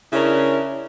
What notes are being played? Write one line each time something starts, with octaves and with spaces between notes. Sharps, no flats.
C#3 C#4 D4 E4 A#4